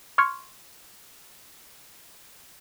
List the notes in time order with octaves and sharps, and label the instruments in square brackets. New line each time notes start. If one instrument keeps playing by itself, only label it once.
[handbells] C6 C#6 F6 G#6 C#7